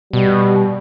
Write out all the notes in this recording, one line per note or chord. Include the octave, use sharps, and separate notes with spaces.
B2 G3